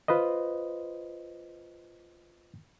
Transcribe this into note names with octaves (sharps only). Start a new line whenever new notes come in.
F4 B4 C5 D#5